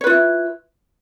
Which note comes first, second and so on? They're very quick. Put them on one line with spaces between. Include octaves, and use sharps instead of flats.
C#5 B4 F4 E4